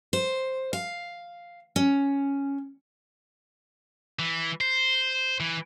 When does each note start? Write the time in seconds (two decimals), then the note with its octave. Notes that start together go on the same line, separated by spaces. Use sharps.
0.13 C5
0.73 F5
1.76 C#4
4.19 E3
4.61 C5
5.40 E3